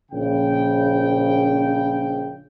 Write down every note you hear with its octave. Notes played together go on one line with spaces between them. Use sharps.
A#1 C#3 G5